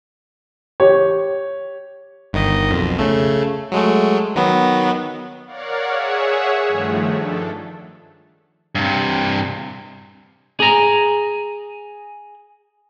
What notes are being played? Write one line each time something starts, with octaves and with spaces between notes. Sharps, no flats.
G4 C#5
G1 D#3 D#5
B1 F2
C#3 A3
F#3 G#3 A3
D#3 F#3 B3
A#4 C#5 D5 F5 F#5
G#4 C#5 E5 F#5
G2 D#3 F3 A3
D4 A4
G2 C3
G#4 A#5